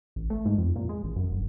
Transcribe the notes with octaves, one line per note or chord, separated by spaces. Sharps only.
A1
A3
G#2
F2
A#2
G#3
A1
F#2
G1